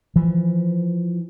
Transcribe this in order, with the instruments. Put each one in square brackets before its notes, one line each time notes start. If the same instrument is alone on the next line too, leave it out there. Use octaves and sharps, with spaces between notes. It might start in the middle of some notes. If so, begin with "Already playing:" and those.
[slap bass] E3 F3